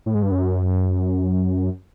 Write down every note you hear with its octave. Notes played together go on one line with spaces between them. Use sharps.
A2
G#2
G2
F#2